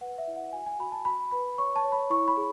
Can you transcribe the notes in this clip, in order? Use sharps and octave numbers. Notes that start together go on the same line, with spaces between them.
B4 F#5
E5
E4
F#5
F#4 G#5
G#5
F#4 B5
A5
F#4 B5
B4 B5
C#5 C#6
A5
C#5
B5
E4 C#6
B5
G#4